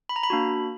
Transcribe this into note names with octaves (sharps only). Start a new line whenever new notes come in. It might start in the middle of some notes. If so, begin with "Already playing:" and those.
B5
A#5
B5
A#3 D4 F#4